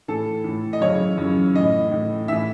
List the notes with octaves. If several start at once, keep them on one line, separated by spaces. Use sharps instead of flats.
A2 E3 A4
A2 E3
D#5
F#2 C#3 E3 C#5
F#2 C#3 E3
A2 E3 D#5
A2 E3
A2 E3 E5